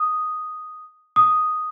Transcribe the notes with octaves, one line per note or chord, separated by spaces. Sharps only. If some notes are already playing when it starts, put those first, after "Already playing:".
Already playing: D#6
D#6